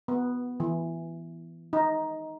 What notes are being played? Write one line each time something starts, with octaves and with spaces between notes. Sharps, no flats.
B3
E3
D#4